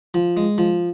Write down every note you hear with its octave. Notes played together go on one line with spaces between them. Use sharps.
F3
G#3
F3